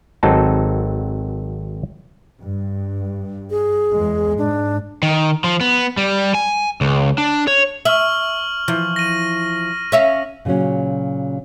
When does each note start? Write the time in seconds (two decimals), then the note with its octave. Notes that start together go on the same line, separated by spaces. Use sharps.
0.23 G#1 F#3 C4 D#4 A4 A5
2.43 G2
3.50 G#4
3.94 E2 G#3
4.38 G#2 D4
5.03 D#3
5.44 F3
5.61 B3
5.97 G3
6.35 G#5
6.81 C#2
7.18 D4
7.47 C#5
7.85 E5 C#6 F6 F#7
8.68 E3 F3
8.96 A#6 D#7
9.92 C#4 E5 F5
10.45 A#2 C#3 F3 F#3 C#4